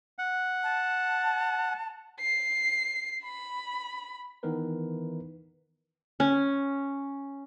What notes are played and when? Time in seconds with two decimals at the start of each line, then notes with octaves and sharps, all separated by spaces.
0.18 F#5
0.63 A5
2.20 C7
3.24 B5
4.43 D#3 E3 B3 D#4 A#4 B4
6.20 C#4